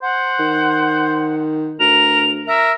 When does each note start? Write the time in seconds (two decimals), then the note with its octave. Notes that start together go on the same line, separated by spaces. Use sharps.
0.02 C5 F#5
0.39 D#3
1.80 D2 A#4 F7
2.47 A#4 E5